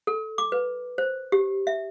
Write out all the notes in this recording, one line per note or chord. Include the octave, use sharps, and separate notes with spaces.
A4
D6
B4
C5
G4
E5